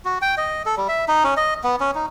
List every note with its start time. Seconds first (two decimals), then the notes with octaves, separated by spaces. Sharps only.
0.05 F#4
0.22 G5
0.38 D#5
0.66 A4
0.77 G3
0.88 E5
1.08 D#4
1.24 C#4
1.37 D#5
1.64 B3
1.80 C#4
1.95 D#4